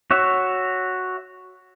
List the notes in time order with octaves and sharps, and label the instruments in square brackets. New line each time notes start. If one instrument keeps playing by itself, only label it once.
[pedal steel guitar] F#4 C#5 E5